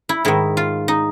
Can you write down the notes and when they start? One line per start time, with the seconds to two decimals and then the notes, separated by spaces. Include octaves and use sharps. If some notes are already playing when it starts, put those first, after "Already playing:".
0.09 E4
0.25 G#2 D#3 E4
0.57 F4
0.88 D#4